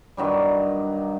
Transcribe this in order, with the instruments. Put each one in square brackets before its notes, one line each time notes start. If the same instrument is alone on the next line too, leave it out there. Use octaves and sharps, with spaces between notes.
[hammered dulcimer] G2 D#3 F#3 G3